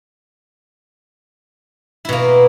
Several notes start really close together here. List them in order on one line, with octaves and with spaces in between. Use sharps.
E4 B2 A#3